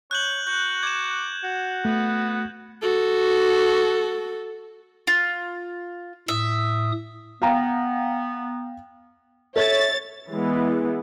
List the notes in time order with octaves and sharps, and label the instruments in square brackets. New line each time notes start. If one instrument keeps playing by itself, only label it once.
[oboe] C#5 [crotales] F#6 G6 F#7
[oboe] F#4 [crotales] G6
[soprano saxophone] D6 [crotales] G#6 E7
[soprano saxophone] F#4
[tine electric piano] A3 [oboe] B3
[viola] F#4 A4
[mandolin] F4
[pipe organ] A2 D#6 [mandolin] E5
[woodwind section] B3 [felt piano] F5 G5 A#5
[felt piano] A4 [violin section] C#5 A6 [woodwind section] E5
[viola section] E3 G#3 B3